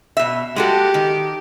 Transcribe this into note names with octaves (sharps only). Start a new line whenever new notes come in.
B2 E5
G#3 F#4 G4 A4
D#3